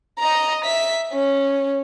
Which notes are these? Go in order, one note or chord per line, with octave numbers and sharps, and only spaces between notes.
D#5 A#5
E5 B6
C#4